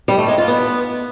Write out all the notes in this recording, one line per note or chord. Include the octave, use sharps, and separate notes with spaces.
G3
A3
G#3
F4
B3